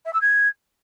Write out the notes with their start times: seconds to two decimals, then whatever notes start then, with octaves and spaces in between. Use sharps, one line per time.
0.05 E5
0.13 E6
0.21 G#6